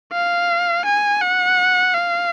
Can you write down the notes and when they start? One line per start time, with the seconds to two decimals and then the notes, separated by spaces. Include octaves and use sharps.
0.13 F5
0.85 G#5
1.21 F#5
1.94 F5